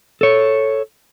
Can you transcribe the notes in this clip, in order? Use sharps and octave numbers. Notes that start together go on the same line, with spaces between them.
A4 C#5